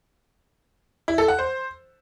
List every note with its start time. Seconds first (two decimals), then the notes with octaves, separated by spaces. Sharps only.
1.08 E4
1.18 A4
1.28 F#5
1.39 C5